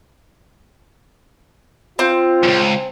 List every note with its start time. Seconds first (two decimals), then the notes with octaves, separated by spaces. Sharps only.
1.99 C4 F4
2.43 C#2 F#2